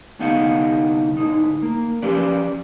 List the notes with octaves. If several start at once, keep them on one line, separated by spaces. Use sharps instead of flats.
C2 D3 B3 D#4 F5 F#5
G#2 D3 D#4
A#3
F3 C#4 G4 B4 D5